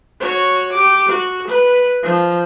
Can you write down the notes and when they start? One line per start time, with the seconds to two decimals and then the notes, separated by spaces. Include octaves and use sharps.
0.20 F#4 C#5
0.73 G4 D6
1.09 F#4
1.48 B4
2.03 F3